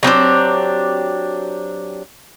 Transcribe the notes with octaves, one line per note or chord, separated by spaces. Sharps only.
F#3 C4 D4 G4